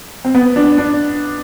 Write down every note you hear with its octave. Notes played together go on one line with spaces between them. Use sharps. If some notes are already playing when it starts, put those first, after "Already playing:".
C4
B3
D4
D4